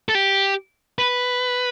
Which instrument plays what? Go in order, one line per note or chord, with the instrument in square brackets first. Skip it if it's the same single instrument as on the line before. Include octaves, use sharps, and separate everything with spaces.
[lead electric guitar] A4
G4
B4